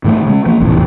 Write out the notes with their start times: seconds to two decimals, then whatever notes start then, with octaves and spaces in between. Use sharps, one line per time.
0.04 G#2 D#3 E3 A3
0.27 C#3 G#3
0.46 F3 A#3
0.60 F1 A#1 E2 A2